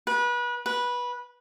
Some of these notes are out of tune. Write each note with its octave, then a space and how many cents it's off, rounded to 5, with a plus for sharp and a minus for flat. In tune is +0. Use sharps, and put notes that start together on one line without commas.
B4 -30
B4 -15